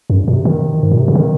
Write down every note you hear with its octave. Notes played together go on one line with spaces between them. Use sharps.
F#2
A#2
C3
D#3
G#2
A#2
C3
C#3
D#3